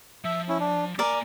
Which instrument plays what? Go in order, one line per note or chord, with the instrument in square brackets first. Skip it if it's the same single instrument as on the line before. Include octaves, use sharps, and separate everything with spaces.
[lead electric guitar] F3 [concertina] E5
[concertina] C#4 E4
D4
[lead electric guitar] A#3 G#5 [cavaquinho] A#4 D5 [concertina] D6